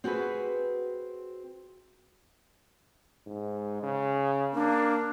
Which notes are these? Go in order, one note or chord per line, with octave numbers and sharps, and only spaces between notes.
C4 F#4 G#4 B4
G#2
C#3
A#3 D4